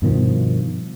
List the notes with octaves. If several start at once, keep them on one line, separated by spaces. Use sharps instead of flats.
G2 B2 D#3 F3